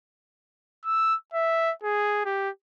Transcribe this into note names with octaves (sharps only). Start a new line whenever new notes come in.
E6
E5
G#4
G4